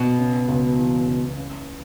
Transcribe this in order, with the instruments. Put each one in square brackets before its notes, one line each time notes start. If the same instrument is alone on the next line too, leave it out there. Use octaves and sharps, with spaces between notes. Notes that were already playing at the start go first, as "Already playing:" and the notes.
Already playing: [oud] B2 [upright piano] B3
[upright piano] C#3
C#2
E3
C#2
C#3